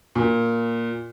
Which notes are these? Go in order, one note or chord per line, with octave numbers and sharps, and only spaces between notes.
A#2